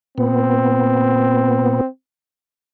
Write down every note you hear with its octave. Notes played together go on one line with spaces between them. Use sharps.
A#2 B3 C4